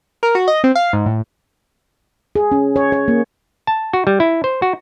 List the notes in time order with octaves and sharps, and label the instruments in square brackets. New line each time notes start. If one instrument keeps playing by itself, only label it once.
[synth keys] A#4
F#4
D#5
C4
F5
G#2
A2
[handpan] G#4
C#4
C#5
C#5
A#3
[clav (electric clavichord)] A5
F#4
G3
E4
C5
F#4